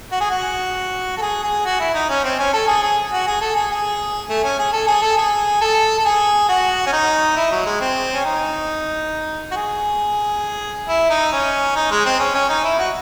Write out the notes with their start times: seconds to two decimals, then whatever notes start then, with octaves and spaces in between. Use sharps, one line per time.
0.12 F#4
0.20 G#4
0.30 F#4
1.17 A4
1.22 G#4
1.43 G#4
1.65 F#4
1.80 E4
1.94 D#4
2.09 C#4
2.24 C4
2.39 C#4
2.53 A4
2.68 G#4
2.83 G#4
3.12 F#4
3.27 G#4
3.41 A4
3.56 G#4
3.71 G#4
4.29 A3
4.44 C#4
4.59 G#4
4.73 A4
4.87 G#4
5.02 A4
5.17 G#4
5.61 A4
5.99 A4
6.05 G#4
6.49 F#4
6.86 C#4
6.93 D#4
7.36 E4
7.52 F#3
7.66 G#3
7.81 C4
8.14 C#4
8.25 D#4
9.51 F#4
9.56 G#4
10.88 E4
11.10 D#4
11.32 C#4
11.76 D#4
11.91 G#3
12.05 C4
12.20 C#4
12.35 C#4
12.49 D#4
12.64 E4
12.79 F#4